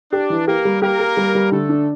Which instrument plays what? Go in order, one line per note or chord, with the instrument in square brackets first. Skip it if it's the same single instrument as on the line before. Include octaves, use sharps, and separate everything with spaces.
[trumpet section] D4 [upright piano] G4
[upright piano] E3
[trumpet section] A#3 A#4 [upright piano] G4
[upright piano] G3
[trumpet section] A#3 A#4 [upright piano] G4
[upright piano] G4
G3
G3
[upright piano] D3 [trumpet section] A3 A4
[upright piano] D4